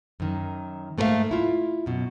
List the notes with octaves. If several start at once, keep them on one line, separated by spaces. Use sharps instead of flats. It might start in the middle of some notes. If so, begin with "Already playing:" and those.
F#2 D#3
G#2 A3 A#3 B4 E5 F5
E4 F4
F#2 B2